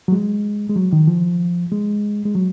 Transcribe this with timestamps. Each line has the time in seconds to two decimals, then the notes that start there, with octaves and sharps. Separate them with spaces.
0.08 F#3
0.12 G#3
0.70 G#3
0.76 F#3
0.93 D#3
1.07 F3
1.72 G#3
2.25 G#3
2.35 F#3